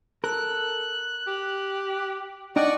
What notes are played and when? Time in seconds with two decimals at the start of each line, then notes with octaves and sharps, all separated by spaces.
0.24 A4 A#4 F#6
1.27 G4
2.56 D4 D#4 D5 D#5 F#5 G5 C#6